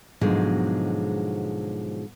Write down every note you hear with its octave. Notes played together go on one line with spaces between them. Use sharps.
G#2 B2 D3 F3 F#3 G#3